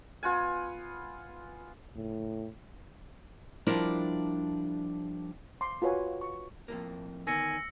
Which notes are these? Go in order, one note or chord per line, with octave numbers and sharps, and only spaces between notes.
B3 F4 F#5 G#5
F#1 A2
F3 G3 D4 E4 F4 A#4
C6 D6
F4 F#4 B4 C#5 G#5
C#6
F2 A2 A#3
D3 D#3 B3 G#5 E6 A#6 C#7